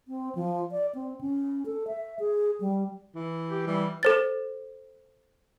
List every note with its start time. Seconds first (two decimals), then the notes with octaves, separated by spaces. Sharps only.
0.08 C4
0.35 F3
0.72 D5
0.95 C4
1.21 C#4
1.66 A4
1.87 E5
2.19 G#4
2.61 G3
3.15 E3
3.50 G4
3.67 E3 G3
4.03 A4 C5 A6